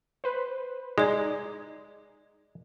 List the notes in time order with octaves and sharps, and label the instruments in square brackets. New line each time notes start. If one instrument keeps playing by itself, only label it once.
[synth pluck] B4 C5
[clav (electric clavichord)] G#3 [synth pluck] D#4 [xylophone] G#4 D5